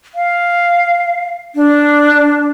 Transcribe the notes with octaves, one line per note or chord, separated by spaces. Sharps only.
F5
D4